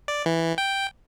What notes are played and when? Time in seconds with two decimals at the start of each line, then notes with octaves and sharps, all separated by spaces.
0.08 D5
0.26 E3
0.58 G5